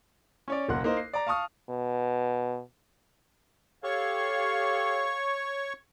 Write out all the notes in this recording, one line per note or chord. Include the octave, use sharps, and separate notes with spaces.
C#4 C#5 D5
F#1 B1 A#3 F#5 C6 F#6
A#3 D#4 C5
C7
D5 A#5
F5 A5 C#6 D#6 F6
B2
G4 A4 C#5 F5 C#6